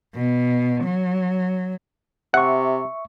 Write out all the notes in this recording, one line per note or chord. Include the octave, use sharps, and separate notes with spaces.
B2
F#3
C3 E5 F#5 C#6